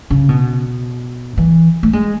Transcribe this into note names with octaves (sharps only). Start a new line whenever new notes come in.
C#3
B2
E3
A3
G#3